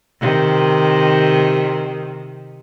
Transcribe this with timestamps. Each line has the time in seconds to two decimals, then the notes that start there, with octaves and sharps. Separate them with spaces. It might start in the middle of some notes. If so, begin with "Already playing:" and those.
0.20 C3 D#3